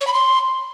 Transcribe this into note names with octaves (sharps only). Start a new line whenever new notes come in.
C#5
B5
C6